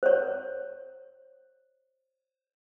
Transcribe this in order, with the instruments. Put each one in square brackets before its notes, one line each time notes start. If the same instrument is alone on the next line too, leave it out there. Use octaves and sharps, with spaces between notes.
[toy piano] C5 C#5